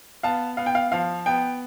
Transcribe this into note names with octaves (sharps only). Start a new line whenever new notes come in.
B3 F5 A5
B3 F5
G5
F5
F3 F5
B3 G5